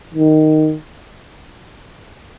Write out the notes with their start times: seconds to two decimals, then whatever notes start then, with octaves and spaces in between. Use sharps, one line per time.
0.15 D#3